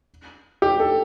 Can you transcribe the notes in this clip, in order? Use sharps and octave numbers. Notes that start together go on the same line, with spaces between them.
G4
A4